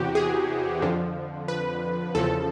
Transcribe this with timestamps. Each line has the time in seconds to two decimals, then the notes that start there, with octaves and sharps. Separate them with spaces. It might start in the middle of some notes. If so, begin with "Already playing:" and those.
Already playing: E2 C3 E3 F#4 G4
0.15 G#4
0.82 F2 D3 F3
1.48 B4
2.15 E2 C#3 F3 A4